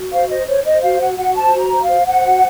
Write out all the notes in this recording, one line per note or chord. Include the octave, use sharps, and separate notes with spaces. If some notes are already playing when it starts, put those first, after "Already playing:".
Already playing: F#4
C5 F5
C5 D#5
C5 C#5
C5 D#5
F#4 F5
F#4 F#5
F#4 F#5
C5 A5
F#4
A#5
C5
F5
C5
C5 F#5
F#4